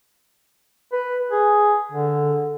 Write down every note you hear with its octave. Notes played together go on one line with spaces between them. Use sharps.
B4
G#4
D3